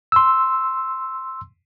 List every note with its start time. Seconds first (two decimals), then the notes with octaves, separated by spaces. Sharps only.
0.12 C6 E6